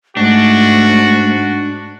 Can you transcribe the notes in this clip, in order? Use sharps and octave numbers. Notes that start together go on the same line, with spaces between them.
G#2 A3 D4 F#4